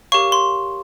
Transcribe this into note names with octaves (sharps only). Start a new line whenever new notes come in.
G4 A#4 C#5 F5 C#6
C6